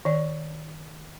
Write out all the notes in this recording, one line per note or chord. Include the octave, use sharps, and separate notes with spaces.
D#3 D5